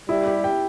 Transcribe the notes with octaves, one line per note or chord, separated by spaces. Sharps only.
G3 E4
G4
G5